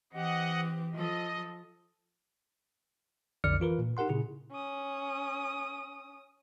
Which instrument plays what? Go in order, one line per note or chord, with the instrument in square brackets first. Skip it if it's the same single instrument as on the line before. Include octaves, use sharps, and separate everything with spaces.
[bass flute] E3 [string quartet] C4 G4 [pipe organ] D#5 F#5
[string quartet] F3 A4 [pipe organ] D#5
[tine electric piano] B1 F2 D3 D5 F6 C#7
E3 F4 A#4 B4
A#2
D#4 G4 A#4 F#5 C6
A#2 C#3 E4 G#4
[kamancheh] C#4 D#6